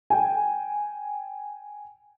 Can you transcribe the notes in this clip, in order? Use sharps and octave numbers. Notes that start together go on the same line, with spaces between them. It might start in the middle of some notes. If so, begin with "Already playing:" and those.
G5 G#5